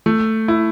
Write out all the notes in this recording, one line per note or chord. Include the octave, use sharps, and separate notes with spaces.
A3
E4